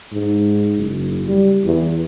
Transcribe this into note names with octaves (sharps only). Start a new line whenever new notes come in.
G#2
F#1
G3
E2